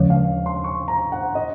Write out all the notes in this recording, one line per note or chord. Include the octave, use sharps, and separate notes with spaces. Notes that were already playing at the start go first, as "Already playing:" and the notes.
Already playing: D#2 C#3 F3 G#3 C#5
F5
C6
C#6
A#5
F#5
D#5